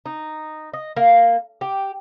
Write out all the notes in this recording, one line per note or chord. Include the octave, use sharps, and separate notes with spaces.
D#4
D#5
A#3
G4